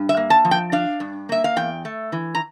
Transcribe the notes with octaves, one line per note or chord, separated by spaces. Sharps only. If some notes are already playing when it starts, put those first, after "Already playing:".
Already playing: G2
E5
A#3
A5
F3
G5
D4 F5
G2
A#3 E5
F5
E2 G5
A3
E3
A#5